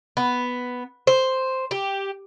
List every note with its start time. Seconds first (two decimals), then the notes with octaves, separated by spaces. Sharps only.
0.17 B3
1.07 C5
1.71 G4